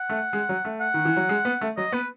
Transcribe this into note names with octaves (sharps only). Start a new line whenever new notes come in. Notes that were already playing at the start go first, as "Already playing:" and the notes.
Already playing: F#5
A3
G#3
F#3
A3
F#5
D#3
E3
F#3
G#3
B3
A3
F#3 D#5
B3 B4